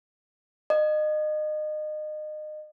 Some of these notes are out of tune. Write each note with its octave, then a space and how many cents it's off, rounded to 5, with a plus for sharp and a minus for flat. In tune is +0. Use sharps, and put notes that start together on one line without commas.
D#5 -30